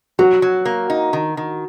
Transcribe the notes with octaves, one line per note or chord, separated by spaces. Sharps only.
F#3 F#4
F#3
A#3
D#4
D#3
D#3